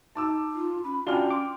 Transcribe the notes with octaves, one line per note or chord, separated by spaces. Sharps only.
D#4 A5 D6 E6
F4
C#4 B5
C#4 D4 F4 F#4 G5 G#5 F6 G7
C6 D6